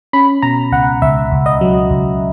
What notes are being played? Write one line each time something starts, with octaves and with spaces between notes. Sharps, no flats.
C#4 B5
B2 A#5
C#2 F#5
C#2 E5
C#2
D#5
F#3
C#2